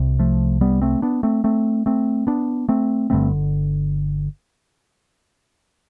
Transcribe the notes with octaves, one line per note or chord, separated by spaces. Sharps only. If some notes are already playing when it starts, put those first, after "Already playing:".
Already playing: C2 C3
F3 A3
G3 B3
A3 C4
B3 D4
A3 C4
A3 C4
A3 C4
B3 D4
A3 C4
G1 G2 D3 A3 C4